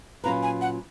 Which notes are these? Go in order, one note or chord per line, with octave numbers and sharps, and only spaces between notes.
A#2 F#3 C#4 F4 B4 A#5
G#5
F#5